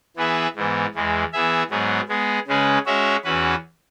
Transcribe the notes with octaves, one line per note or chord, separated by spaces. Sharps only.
E3 B3 G#4 B4 E5
G#2 E3 B3
E2 E3 G#3
E3 B3 G#4 E5
G#2 F#3 B3 G#4
G#3 B3 G#4
C#3 G#3 C#4 G#4 B4
G#3 C#4 F#4 C#5 E5
E2 E3 C#4 F#4 B4